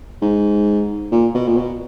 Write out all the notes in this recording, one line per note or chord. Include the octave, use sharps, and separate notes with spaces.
G#2
A#2
B2
A#2
B2